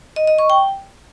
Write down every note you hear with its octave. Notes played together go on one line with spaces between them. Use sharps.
D#5
D#5
C#6
G5